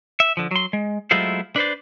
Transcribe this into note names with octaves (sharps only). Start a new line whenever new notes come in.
E5
D3 F3
F#3 C6
G#3
F#3 G#3 A3 E4 F4 C5
D4 B4 C5 D5